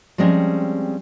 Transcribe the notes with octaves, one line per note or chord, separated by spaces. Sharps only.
F3 G3 G#3 C4 C#4